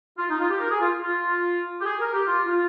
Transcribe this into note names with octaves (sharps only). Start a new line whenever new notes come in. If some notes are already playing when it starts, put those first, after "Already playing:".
F4
D#4
F4
G4
A#4
G#4
F4
F4
G4
G#4
A#4
G4
F4
F4